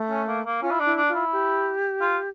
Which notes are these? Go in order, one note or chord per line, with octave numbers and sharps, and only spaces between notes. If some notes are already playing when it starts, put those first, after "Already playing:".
Already playing: A3
C#4
A#3
A#3
C#4 F4
E4
D4
E4
D4
F4
E4
G4
F4